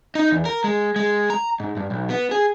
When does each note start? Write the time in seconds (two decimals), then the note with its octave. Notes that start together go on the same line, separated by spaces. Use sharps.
0.15 D#4
0.31 E2
0.45 A#4
0.64 G#3
0.96 G#3
1.30 A#5
1.60 G#2
1.77 G2
1.91 B1
2.10 B3
2.31 G#4